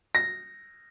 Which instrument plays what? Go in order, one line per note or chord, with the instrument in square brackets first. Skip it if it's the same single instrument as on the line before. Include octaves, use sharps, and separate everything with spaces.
[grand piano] A#6